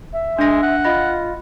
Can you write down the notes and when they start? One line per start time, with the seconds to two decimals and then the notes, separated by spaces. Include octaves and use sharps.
0.13 E5
0.39 G#3 D4 A#6
0.63 F#5
0.85 F4 D#5 B5 A#6